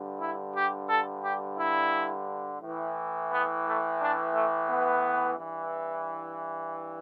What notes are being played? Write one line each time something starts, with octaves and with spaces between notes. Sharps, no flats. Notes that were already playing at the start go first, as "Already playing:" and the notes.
Already playing: G2 D3
E4
G4
A4
G4
E4
A2 E3
B3
A3
D4
A3
B3
G2 E3